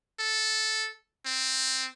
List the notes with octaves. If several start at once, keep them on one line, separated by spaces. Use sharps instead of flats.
A4
C4